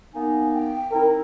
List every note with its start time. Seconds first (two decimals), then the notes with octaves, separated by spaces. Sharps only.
0.14 A#3 B3 D#4 G#5
0.54 G5
0.91 D#3 C4 E4 A#4